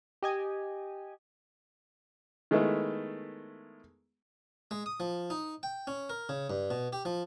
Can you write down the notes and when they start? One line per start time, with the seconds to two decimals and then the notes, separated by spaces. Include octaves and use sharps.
0.22 G4 D#5 G#5
2.51 D#3 G#3 A3 B3 E4 A4
4.71 G#3
4.86 D#6
5.00 F3
5.30 D#4
5.63 G5
5.87 C#4
6.09 A#4
6.29 C#3
6.50 G2
6.71 B2
6.93 G4
7.05 F3